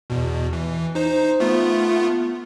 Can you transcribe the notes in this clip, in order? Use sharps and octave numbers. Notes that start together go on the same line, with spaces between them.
E2 B2
E3
D#4 C5
A3 B3 F4